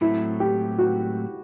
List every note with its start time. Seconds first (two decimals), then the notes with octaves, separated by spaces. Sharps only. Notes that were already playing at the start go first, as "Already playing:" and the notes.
0.01 A2 F#3 A3 C4 E4
0.40 G4
0.78 F#4